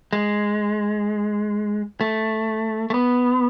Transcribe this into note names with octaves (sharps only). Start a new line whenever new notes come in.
G#3
A3
A3
B3